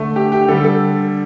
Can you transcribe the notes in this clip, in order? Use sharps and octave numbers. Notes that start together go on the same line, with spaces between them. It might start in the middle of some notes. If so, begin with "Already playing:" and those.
Already playing: D3 A3
G4
G4
D3 G3 A4
A4